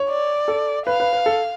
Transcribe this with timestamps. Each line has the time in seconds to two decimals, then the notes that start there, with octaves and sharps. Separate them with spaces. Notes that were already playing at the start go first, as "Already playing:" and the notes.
Already playing: C#5
0.09 D5
0.48 A4
0.86 B4 F5
1.00 B4
1.13 B4
1.26 A4